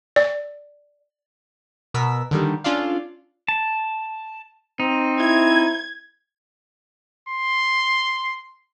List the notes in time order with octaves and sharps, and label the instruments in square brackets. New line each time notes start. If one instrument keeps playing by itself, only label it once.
[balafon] D5
[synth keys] B2 B3 A#4 E6 B6
D3 D#3 G3
C#4 D4 F4 A4 D5 F5
[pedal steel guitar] A5
[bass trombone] C4 [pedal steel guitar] D#4
[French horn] E4 [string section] G#6
[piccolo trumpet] C6